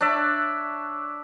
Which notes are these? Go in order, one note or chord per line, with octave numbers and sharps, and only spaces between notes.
D4 C#5 D5 E5